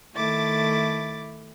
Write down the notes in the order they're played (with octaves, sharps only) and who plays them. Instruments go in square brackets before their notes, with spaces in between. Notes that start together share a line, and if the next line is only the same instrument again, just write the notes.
[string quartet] D#3 A3 E4 A4 D6 A6